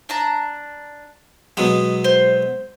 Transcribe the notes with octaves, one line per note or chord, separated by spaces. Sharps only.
D4 A5 A#5
B2 F#3 G#3 D#6
C5